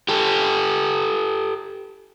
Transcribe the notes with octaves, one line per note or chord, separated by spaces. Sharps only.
G4 A4